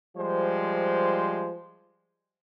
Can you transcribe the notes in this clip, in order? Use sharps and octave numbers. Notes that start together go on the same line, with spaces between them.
F3 G3 G#3 C5